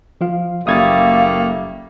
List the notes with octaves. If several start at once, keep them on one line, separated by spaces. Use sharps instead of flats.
F3 F4 F5
F#1 G3 A3 A#3 F5 D#6 G#6 A6